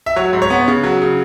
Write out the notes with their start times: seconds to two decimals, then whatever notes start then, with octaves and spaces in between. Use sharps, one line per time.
0.06 E5
0.16 F#3 C#5
0.33 G#2
0.42 C#5
0.50 B3
0.68 C#3
0.84 F#3
1.02 C#3